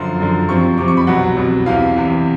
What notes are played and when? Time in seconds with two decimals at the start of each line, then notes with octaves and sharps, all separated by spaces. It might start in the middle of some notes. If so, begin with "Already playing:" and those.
Already playing: F#2 D3 F3 C6
0.19 F#2 D3 F3
0.48 F2 C3 F3 C#6
0.78 F2 C3 F3 D6
0.88 C#6
0.97 B5
1.07 C2 B2 F#3 F#5
1.37 C2 B2 F#3
1.66 E2 C3 E3 F5
1.95 E2 C3 E3